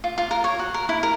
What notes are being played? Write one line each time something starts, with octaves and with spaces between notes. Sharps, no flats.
F4
F4
A#4
C#5
F#4
A#4
E4
A#4